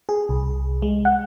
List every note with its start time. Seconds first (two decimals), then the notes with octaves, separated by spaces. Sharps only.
0.09 G#4
0.29 C2
0.82 G#3
1.05 F#5